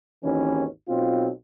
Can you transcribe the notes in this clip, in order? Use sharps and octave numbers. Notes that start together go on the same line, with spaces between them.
G#1 D#2 E3 C#4
B1 B2 C4 F4